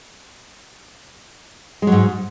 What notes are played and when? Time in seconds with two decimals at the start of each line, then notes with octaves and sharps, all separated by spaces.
1.82 G#3
1.87 F#3
1.92 G#2